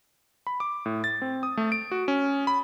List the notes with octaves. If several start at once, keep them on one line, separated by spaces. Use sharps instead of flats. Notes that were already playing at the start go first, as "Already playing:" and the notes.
B5
D6
A2
A6
C4
D#6
A3
D7
F#4
C#4
B5